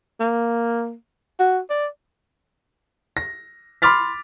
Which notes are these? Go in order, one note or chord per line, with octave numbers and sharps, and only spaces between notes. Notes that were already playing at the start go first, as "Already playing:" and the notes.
A#3
F#4
D5
A#6
B5 C6 D6 F6 A6 B6